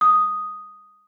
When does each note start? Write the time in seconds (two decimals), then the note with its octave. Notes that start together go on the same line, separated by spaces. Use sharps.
0.01 D#6